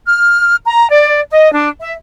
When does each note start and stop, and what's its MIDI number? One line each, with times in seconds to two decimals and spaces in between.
0.07 0.56 89
0.65 0.90 82
0.90 1.20 74
1.31 1.51 75
1.53 1.69 62
1.80 1.92 76